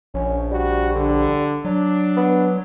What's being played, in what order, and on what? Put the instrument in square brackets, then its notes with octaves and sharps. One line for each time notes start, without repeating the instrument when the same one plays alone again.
[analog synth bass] A#1 [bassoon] C#4
[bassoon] G3 [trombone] F#4
[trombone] D3
[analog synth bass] F#3 [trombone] D4
[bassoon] B3